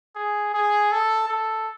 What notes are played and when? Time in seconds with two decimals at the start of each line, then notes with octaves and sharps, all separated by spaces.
0.15 G#4
0.54 G#4
0.92 A4
1.28 A4